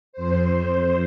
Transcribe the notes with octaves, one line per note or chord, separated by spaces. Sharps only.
F2 C5